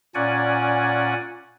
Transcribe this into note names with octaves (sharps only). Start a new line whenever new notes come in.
A#2 C#4 D5 F#5 G#5